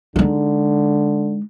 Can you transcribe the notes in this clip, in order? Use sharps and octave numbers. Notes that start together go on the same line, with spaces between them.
D3 G#3 D#4